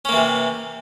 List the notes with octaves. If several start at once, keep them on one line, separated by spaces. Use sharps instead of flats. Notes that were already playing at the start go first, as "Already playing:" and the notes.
C3 E3 A#3 C#4